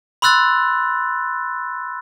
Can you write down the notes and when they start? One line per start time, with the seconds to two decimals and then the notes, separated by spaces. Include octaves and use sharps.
0.22 B5 C6 E6 F#6 A6